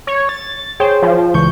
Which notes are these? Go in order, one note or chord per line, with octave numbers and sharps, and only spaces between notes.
C#5
A6
G#4 C5 C#5 G5
F3
C#2 E3 C#6 G6